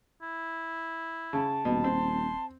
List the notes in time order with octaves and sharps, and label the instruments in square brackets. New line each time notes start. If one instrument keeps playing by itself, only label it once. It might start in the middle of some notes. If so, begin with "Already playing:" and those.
[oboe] E4
[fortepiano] C#3 [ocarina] A5
[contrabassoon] D#1 [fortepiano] B2
[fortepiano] C4 [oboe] C6